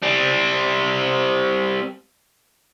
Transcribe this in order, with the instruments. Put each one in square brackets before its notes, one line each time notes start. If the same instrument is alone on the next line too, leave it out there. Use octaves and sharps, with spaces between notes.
[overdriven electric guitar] G3 C4